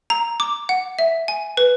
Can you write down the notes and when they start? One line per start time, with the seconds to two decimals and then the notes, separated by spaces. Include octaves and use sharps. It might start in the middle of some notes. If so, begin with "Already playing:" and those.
0.10 A#5
0.40 D6
0.69 F#5
0.99 E5
1.28 G#5
1.57 B4